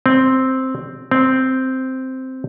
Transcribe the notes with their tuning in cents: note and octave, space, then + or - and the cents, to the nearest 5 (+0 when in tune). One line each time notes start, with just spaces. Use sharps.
C4 +0
C4 -5